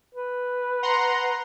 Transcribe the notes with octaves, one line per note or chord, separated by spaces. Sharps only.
B4
F#5 A#5 C6